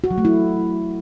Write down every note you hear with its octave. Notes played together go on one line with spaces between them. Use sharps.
F#4
F#3
A3
E4